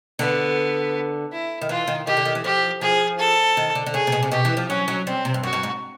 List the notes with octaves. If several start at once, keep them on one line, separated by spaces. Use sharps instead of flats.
D3 B3
E4
D#3
E3 F4
D#3
D#3 G4
D3
D#3
E3
F3 G4
F3 G#4
A4
D#3
D3
D3
C#3 G#4
C3
B2
C3
B2 G4
E3
F3
F#3 C#4
F#3
G3 C4
C3
G2
F#2 F#4
G2
G#2